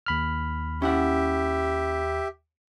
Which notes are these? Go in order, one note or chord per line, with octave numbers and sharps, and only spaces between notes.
D#2 B5 F6
C#4 E4 G4 E5 F#5